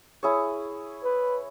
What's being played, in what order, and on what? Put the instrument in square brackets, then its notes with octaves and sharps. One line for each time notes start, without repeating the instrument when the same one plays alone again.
[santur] E4 G#4 C#5
[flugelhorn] B4